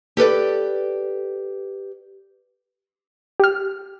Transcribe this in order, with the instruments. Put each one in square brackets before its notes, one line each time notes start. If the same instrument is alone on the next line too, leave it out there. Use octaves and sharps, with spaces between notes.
[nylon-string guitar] G4 A4 B4 D5
[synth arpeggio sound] G4 F6